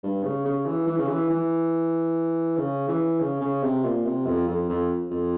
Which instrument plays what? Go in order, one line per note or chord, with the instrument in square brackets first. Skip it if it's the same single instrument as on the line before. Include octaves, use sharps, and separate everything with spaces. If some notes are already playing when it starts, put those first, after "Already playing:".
[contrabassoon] G2
C#3
C#3
E3
E3
C#3
E3
E3
C#3
E3
C#3
C#3
C3
A#2
C3
F2
F2
F2
F2